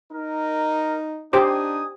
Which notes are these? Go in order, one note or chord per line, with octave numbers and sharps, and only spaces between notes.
D#4 A#4
D4 D#4 G4 C5 G#5 D6 D#6